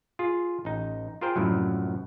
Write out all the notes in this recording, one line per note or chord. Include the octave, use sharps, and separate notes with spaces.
F4 G#4
A1 D#4
F4 G#4 A#4 C5 G5
C2 F#2 A2 F3 F#3